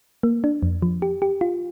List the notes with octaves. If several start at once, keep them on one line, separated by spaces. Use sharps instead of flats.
A#3
D4
F2
F3
G4
G4
F4